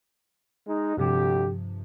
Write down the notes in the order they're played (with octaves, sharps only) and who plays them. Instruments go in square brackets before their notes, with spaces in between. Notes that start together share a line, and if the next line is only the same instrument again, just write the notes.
[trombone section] G#3 D#4
[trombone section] D2 G4 [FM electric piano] G2 C3 F3